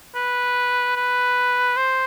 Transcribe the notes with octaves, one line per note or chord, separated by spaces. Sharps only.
B4
B4
C5